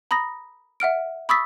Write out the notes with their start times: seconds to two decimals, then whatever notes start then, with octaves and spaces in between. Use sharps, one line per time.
0.11 A#5 B5 D#6 A#6
0.80 E5 F#5 F6 D7
1.29 B5 C#6 D#6 E6 A6 B6